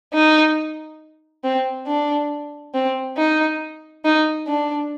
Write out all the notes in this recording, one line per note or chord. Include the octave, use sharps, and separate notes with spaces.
D#4
C4
D4
C4
D#4
D#4
D4